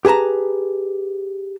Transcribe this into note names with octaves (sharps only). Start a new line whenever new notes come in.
G4 G#4 B4 A5 A#5